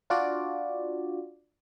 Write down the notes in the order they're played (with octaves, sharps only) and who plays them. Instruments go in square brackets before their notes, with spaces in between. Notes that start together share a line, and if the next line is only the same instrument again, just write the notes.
[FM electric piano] D4 F4 F#4 D5